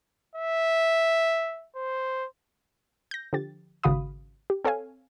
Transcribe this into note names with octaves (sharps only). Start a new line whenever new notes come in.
E5
C5
G6 A#6
D3 F3 G4 A6
G#1 C#3 F#4 F5 B5 D#6
G4
C4 A4 C#5 F5 G#5